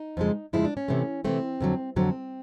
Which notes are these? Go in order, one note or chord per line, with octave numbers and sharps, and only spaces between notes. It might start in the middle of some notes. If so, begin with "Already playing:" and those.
Already playing: D#4
F2 C#3 F3 G#3
F2 C#3 F3 G#3 E4
D4
C#4
C3 E3 A3
C3 E3 A3 C4
F2 D3 F#3
F2 D3 F#3 C4